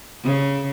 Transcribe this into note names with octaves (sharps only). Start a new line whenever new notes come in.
C#3